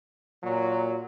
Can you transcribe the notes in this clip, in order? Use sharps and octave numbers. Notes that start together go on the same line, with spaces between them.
A#2 F#3